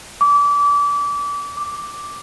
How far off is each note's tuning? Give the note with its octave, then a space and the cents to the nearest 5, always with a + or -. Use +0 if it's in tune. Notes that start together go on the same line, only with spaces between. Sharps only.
D6 -30
D6 +0